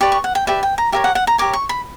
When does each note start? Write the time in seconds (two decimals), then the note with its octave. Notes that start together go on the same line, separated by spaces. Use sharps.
0.01 G4 B4 D5 C#6
0.12 C#6
0.24 F#5
0.35 G5
0.47 G4 B4 D5 E5
0.63 G5
0.78 A#5
0.92 G4 A#4 C#5 E5
1.04 F#5
1.15 F#5
1.27 A#5
1.38 G4 A#4 C#5 D6
1.53 C#6
1.69 B5